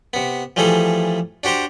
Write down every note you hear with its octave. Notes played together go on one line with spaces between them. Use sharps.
C3 B3
E3 F3 G3 A3 G#4 A4
D4 F#4 G4 C5 A#5